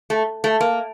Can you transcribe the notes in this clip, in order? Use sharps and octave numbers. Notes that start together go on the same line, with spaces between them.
A3
A3
A#3